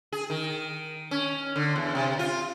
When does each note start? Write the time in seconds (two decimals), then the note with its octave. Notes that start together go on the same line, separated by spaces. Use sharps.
0.12 G#4
0.30 D#3
1.11 C#4
1.56 D3
1.76 E2
1.95 C3
2.19 F4